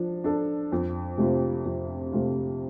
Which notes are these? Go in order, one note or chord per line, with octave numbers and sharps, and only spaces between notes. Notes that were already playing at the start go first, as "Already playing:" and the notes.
Already playing: F3 D4
D4 A4
F2
C3 A3 C4 F4
F2
C3 A3 C4 F4